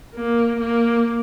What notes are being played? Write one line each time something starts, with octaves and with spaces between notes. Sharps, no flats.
A#3
A#3